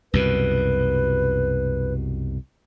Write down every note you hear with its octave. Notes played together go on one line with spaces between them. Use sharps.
C2 F#2 B2 B4